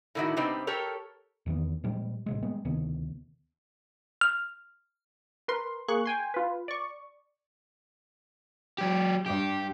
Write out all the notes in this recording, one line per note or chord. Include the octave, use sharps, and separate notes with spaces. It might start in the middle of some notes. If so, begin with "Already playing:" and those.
A2 D3 D#3 A#3 E4 F#4
C3 G3 B3 C4 D#4
G4 A4 A#4 C#5
E2 D#3 E3 B3
A#2 F3 G3 G#3
A1 C3 G#3
G3 G#3 B3
D2 C3 D#3 B3
F6
A#4 B4 C6
A#3 G#4 C#6 F#6
G5 G#5 C6
F4 B4
D5 C#6
F#3 G4
G2 G4